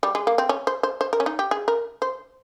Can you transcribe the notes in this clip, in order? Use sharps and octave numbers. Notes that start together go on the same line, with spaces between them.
G3
G#3
A#3
C4
C#4
C5
C5
C5
A#4
C#4
D#4
G4
G#4
A#4
C5